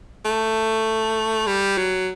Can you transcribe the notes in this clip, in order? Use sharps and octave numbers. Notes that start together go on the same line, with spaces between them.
A3
G3
F#3